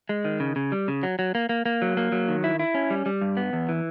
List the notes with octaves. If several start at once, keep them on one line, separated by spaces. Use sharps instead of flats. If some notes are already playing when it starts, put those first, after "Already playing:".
G#3
D#3
C#3
C#3
G3
C#3
F#3
F#3
A#3
A#3
A#3
F#3
A#3
F#3
D#3
E4
E4
C#4
G3
G3
G2
B3
E2
E3